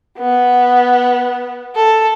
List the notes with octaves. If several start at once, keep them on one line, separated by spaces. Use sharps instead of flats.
B3
A4